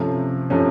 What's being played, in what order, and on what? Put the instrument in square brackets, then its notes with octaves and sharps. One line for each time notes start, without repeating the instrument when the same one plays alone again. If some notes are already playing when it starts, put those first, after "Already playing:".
Already playing: [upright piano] C3 F3 A3 C#4
C3 F3 A3 C#4